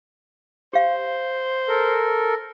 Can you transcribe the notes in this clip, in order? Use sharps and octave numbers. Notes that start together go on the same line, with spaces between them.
G4 C5 F5
A4 A#4